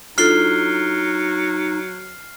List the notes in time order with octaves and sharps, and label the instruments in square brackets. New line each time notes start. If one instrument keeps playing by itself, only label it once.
[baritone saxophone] F#3 [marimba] D4 F4 A4 [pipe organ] D#4 [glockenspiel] F6 C7 G7